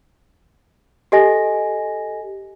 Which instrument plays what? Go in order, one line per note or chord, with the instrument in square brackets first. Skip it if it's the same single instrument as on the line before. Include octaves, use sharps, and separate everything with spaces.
[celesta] G4 A4 D#5 G#5 A#6